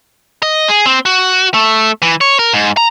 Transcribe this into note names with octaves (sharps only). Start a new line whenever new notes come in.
D#5
G#4
C4
F#4
A3
E3
C#5
A#4
G#2
A#5